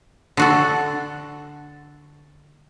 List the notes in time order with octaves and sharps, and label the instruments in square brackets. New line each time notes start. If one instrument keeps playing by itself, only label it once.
[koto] D3 F#4 A4